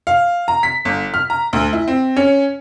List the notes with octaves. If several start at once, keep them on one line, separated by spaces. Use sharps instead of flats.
F5
A#5
B6
G1
F6
A#5
D2
E4
C4
C#4